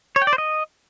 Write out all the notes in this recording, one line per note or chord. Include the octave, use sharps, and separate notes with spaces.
C#5
G5
D5
C5
D#5